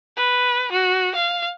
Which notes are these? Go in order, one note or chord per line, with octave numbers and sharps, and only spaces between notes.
B4
F#4
F5